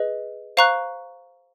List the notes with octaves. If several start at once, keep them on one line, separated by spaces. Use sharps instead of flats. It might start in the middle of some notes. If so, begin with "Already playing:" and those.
Already playing: G#4 B4 D#5
C5 F5 A#5 C#6 F#6